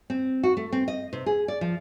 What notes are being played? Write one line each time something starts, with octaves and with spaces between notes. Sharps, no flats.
C4
F#4
A3
C4
D#5
C3
G#4
D5
F3